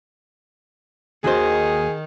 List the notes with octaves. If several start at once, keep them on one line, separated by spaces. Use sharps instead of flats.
D#2 D#3 F#4 G#4 C5